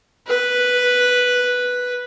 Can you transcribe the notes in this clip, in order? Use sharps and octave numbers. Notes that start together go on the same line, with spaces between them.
B4